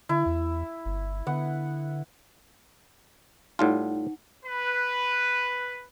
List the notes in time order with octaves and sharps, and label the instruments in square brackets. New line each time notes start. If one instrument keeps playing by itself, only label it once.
[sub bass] D3 [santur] E4
[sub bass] E2
G1
[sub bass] D3 [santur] B3 F#5
[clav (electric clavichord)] A2 G3 F4 [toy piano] D#4 F#5
[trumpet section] B4